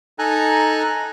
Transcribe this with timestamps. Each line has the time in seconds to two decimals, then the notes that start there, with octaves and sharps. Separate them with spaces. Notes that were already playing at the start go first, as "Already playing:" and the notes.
0.19 D#4 A4 G#5 A#5 F#6